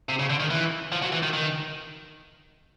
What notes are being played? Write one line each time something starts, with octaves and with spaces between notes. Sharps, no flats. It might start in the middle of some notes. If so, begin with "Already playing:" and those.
C3
C#3
D3
D#3
E3
F3
F#3
E3
D#3
D#3